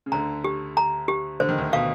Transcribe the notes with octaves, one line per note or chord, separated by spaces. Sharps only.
C#3
D2 D3 A#5
G4
A#5
G4
D3 C5
D#3
D2 D3
B2 F5